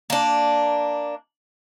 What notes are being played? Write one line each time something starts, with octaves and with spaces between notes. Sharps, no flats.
A#3 D4